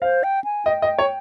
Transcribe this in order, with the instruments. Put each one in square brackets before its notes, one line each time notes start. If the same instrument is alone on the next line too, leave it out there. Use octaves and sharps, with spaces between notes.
[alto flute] C5 [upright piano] F5
[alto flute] G5
G#5
[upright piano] D#5 [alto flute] G5
[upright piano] D#5
C#5